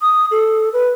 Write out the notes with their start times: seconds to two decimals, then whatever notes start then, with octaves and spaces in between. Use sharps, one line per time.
0.01 D#6
0.31 A4
0.73 B4